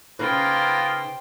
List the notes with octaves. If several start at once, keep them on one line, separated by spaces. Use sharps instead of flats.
C#3 A#3 B3 D#4 F4 B4 C5 G5